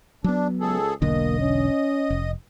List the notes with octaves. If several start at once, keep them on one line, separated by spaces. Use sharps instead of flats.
F#3 B3 D4
C#2 G#4 A4
E1 B1 D3 A#3 D#5
C#4
F1